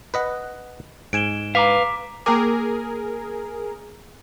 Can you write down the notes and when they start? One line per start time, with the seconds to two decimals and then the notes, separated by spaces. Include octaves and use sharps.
0.14 B4 D#5 F#5
1.13 G#2 G#5 D7 E7 G7
1.55 B4 F5 A#5 D6 B6
2.26 A#3 G#4 A#4 A#5 D6